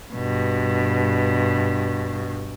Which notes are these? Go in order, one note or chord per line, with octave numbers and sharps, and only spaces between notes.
G2 B2